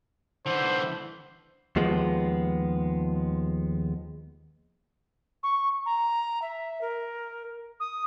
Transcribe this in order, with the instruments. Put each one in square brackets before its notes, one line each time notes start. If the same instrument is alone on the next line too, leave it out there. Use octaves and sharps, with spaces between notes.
[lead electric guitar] D3 E3 [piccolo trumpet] C5
[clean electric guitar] D#2 F3 G#3 B3
[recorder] C#6
A#5
E5
A#4
D#6